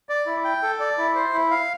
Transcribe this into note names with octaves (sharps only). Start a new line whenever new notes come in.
D5
E4
G5
A4
D5
E4
C5
E4
F5